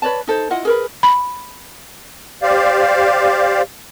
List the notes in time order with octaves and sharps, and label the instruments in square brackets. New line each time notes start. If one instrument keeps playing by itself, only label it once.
[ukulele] B4 C#5 D5 A5
D#4 A4 C5
E4 F4 D#5 F#5
G#4 A#4 B4
[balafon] B5
[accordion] G4 C5 D5 F5